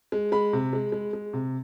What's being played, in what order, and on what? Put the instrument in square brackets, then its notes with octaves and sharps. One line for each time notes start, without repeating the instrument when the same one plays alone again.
[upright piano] G#3
G#3 B5
C3
G#3
G#3
G#3
C3